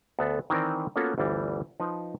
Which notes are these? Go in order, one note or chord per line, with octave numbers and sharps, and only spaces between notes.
D2 B3 A4
D#3 E3 C4 A#4 D5
A#3 B3 C#4 F4 F#4 A4
G1 D2 E3 G3
F3 D#4 B4